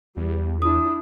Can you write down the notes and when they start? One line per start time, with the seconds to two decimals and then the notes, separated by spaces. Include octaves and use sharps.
0.17 E2 G3
0.62 D4 E4 D#6